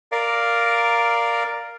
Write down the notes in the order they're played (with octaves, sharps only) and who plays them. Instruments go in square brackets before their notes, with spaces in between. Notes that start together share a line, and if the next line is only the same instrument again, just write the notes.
[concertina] A#4 D5 F5